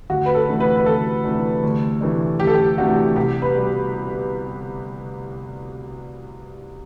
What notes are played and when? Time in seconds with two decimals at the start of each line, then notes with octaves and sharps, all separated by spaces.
0.10 D2 F#4
0.26 B4
0.35 A4
0.48 C3 E3 A3 D4
0.60 B4
0.76 B4
0.86 D2 A4
1.24 C3 E3 A3 D4
1.63 D2
2.01 C3 E3 A3 D4
2.40 D2 G4
2.47 A4
2.55 G4
2.78 C3 E3 A3 D4 F#4
3.16 C2 G4
3.42 B4
3.55 B2 G3